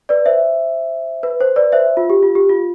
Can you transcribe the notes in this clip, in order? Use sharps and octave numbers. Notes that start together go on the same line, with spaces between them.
B4 D5
C5 E5
B4
C5
B4 D5
C5 E5
F4
G4
F4
G4
F4